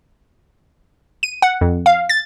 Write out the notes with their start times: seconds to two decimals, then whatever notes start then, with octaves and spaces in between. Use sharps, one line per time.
1.23 D#7
1.42 F#5
1.61 F2
1.86 F5
2.09 A6